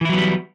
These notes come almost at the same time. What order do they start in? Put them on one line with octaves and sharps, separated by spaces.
E3 E4 F#3 B3 G3